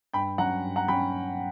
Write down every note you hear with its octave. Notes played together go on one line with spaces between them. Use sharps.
G2 G5 B5
F#3 C#4 F#5 A#5
G2
F#5 A#5
F#3 C#4 G5 B5